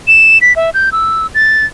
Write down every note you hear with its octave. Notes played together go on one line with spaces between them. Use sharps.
E7
B6
E5
G6
E6
A6